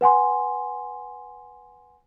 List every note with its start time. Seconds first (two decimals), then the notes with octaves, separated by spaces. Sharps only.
0.01 B4 F#5 G#5 C6